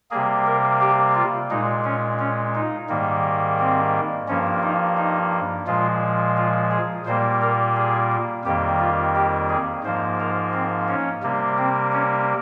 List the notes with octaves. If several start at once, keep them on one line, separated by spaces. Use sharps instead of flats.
C3 G3 A#3 G#4
A#4
G4
F4
A#2 G#3 D#4
C#4
C#4
D#4
G#2 D#3 G3 A#3
C4
G2 F3 A#3 C#4
D#4
D#4
A#2 F3 G#3 F4
F4
G#4
A#2 G3 A#3 C5
A#4
G#4
F2 D#3 G3 A#3 G4
F4
G4
G#4
G#2 F3 A#3 C5
A#4
C4
C#4
C3 G3 A#3
C4
C#4